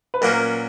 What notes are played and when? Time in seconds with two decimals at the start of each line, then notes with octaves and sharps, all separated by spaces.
0.14 B4
0.21 A#2 F#3 A#3 C#4 A#4